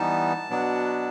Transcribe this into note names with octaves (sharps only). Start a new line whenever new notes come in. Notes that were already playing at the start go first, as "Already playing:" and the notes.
Already playing: E3 G3 B3 D#4 A5
B2 F#3 B3 D4